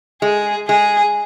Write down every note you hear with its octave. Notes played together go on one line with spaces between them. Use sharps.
G#3 G#4
G#3 G#4